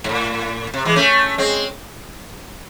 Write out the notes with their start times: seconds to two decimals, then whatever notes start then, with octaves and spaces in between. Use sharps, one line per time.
0.04 G#2
0.09 A2
0.74 C3
0.85 E3 G#3
0.96 A3 C#4
1.38 G#3 C4